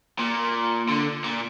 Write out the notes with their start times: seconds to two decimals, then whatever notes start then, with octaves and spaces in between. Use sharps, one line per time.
0.19 A#2
0.88 D3
1.24 A#2